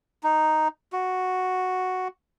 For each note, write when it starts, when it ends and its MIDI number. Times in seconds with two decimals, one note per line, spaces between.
0.23 0.68 63
0.93 2.08 66